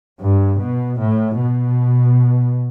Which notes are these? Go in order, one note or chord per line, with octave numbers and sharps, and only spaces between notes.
G2
B2
A2
B2